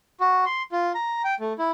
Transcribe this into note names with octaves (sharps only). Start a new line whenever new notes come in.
F#4
C6
F4
A#5
G5
A3
E4